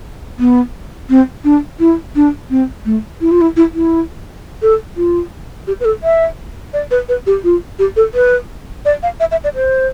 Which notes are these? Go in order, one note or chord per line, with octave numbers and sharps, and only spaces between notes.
B3
C4
D4
E4
D4
C4
A3
E4
F4
E4
E4
E4
A4
F4
G4
B4
A4
E5
D5
B4
B4
G4
F4
G4
A4
B4
D5
F5
E5
E5
D5
C5